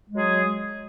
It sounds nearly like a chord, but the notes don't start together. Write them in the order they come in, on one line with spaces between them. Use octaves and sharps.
G#3 F#3 G#4